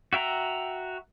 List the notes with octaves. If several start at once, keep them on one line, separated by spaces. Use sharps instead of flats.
F#4 E5 G5 A#5